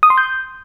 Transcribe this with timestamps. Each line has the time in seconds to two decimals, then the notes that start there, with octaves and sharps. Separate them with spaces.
0.03 D#6
0.10 C6
0.18 G6